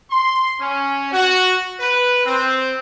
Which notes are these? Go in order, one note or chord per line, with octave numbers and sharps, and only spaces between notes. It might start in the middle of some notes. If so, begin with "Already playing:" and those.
C6
C#4
F#4
B4
C4